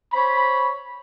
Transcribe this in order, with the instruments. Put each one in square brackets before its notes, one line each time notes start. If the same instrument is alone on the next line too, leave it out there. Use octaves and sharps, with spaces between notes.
[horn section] C5 C#5 B5